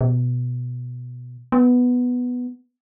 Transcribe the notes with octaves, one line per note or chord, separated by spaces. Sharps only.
B2
B3